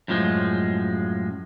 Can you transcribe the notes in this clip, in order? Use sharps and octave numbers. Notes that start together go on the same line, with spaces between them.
F#2 A2 F3 G#3